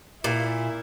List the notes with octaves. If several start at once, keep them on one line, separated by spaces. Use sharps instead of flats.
A#2 E4